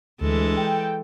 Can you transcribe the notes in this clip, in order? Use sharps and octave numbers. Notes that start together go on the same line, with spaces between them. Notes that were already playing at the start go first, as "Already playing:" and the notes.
D2 E3 G#3 A4
G5